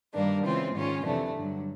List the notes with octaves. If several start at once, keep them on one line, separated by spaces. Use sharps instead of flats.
G2 D#3 G3 A#3 D4
C#3 E3 G#3 C4 F4
G#2 D#3 G#3 C#4 F4
F2 C3 E3 A3 D4
G2 D3 F#3